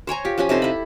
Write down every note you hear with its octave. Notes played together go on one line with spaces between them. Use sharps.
C5 C#5 G#5 A#5
F4 G4
F3 C#4 G4 G#5
C3 D#4 A4 C6
E4 B5